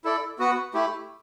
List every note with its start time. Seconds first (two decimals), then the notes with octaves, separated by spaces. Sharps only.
0.04 E4 A4 D5
0.39 B3 F#4 B4 F#5
0.74 A3 E4 G4